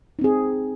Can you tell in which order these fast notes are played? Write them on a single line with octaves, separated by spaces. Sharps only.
D#4 C4 G#4